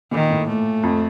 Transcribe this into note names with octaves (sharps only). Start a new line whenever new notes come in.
A#2 D#3
A2
A3
F2